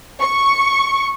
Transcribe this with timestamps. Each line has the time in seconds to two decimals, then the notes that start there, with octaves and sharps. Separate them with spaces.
0.21 C#6